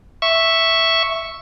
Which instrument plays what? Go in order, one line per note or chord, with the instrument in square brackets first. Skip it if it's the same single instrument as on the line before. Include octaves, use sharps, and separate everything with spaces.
[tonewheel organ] E5 C#6